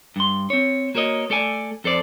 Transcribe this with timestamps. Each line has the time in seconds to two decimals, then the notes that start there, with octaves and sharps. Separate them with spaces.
0.16 G2 C6
0.50 C4 C#5
0.95 A#3 F#4 A#4 C#5 D#5
1.30 A3 A4 D5 G#5
1.84 F2 A4 C5 D5